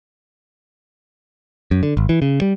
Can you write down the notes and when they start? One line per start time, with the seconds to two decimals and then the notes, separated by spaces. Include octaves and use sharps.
1.71 F#2
1.83 D3
1.97 G#1
2.09 E3
2.22 C#3
2.41 G3